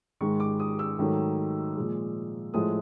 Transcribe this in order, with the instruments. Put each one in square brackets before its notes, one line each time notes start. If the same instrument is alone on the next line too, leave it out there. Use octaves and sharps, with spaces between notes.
[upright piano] G#2 D#3 G#3 C#6
D6
D#6
E6
G#2 D#3 F#3 A3
A#2 F3 G#3
A2 F3 G#3 D#6